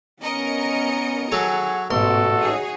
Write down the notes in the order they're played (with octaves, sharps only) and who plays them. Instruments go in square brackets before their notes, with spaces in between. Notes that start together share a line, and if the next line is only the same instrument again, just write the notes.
[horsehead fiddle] B3 C#4 [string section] A#4 D#5 C#7
[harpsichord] F#3 A4 C#5 [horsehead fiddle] G#4 F#5
[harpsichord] A1 C6 [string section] G#2 B2 [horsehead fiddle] F#4 [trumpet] A4
[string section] D#4 G#4 C#5